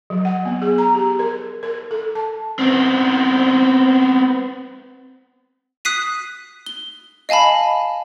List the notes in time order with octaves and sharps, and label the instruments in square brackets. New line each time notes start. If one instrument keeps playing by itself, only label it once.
[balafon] F#3
F#5
B3
G#4
A#5
G4
A#4
A#4
A4
A5
[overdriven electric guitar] B3 C4
[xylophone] D#6 F#6 B6 C7 D#7
G7
D#5 F5 G#5 A5 B5